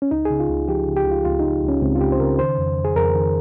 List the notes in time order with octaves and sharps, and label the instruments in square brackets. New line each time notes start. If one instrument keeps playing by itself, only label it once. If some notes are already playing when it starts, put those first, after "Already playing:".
[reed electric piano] C#4
C#2 D#4
G#4
C#3
F4
C#2
F3 G4
C#3
G4
C#2
F4
C#2 F4
C#2 D#4
C#2
C#4
C#2 C4
F4
C#2 G4
C5
C#3 A#4
D#3 C5
F2
F2
G#4
F2 A#4
D#3